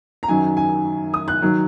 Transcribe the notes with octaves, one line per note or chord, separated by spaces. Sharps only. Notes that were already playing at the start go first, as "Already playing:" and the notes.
A#5
F#2 D#3 F#3 G#5
G#5
D#6
F#6
D#3 F#3